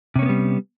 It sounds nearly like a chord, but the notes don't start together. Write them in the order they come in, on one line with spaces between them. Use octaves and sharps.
C3 C#4 A#3 B3 G3